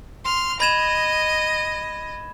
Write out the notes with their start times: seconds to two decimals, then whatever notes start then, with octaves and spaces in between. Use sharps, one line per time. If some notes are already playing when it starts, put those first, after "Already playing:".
0.24 C6 F6
0.60 D#5 B5 G#6 E7